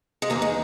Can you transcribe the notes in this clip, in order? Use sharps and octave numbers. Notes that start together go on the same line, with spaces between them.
G#3
E2 D#3 A#3
G#3